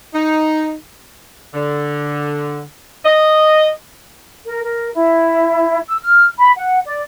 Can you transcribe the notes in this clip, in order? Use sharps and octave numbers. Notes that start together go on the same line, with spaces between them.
D#4
D3
D#5
A#4
A#4
E4
E6
F6
B5
F#5
D5